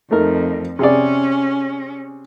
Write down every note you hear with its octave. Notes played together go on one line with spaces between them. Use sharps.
F2 A3 D#4 A#4
C3 C#4 G#4 D5